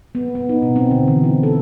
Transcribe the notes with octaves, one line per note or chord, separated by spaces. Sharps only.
B3
B3
D#4
B2
C4
D3
E3
E4
A4